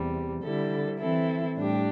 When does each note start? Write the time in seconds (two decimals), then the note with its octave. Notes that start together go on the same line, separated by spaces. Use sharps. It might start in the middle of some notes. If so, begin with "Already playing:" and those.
Already playing: E2 C3 G3
0.42 D3 G3 E4 A4
0.99 E3 C4 E4 A4
1.57 A2 G3 D4 G4